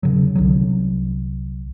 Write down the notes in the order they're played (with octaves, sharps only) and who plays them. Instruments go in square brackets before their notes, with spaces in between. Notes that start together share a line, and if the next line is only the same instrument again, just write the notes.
[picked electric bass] E1 C#3 F#3
C2 D3 F#3